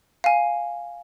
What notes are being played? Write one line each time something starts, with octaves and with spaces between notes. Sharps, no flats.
F5 G#5